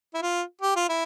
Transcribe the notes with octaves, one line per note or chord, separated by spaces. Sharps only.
E4
F4
G4
F4
E4